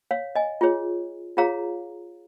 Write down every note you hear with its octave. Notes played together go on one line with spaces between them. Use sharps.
C#5 F5
D#5 G#5
F4 G#4 C#5
F4 G#4 C#5 F5 A#5